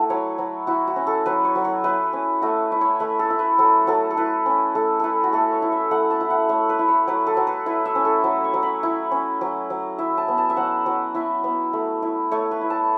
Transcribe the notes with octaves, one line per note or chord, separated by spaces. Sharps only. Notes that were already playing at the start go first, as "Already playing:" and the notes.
Already playing: A3 E4 F#4 A4 B4 A5 B5
F#3 C#5
F#3
E4 F#4
F#4
C#4
A4
F#3 B4
C#5
F#3
C#5
E4 B4
C#4
A3 F#4
E4
C#5
A3 B4
A4
E4
B4
F#3 A4
F#3 A4
A4
E4 B4
C#4
A3 A4
E4 A4 B4
F#4
A3 A4
C#5
E4
E5
A3 F#5
A5
E4
F#5
A3 C#5
B4
E4
C#5
F#3 B4
A4
F#3
B4
E4 B4
E5
C#4
A4
F#3 E5
C#6
F#3
B5
E4
C#4
F#3
F#3
E4 E5
A5
B3
A5
E5
F#3 F#5
F#3
E4 E5
B3
A3
E4
A3 C#5
B4
E4
A5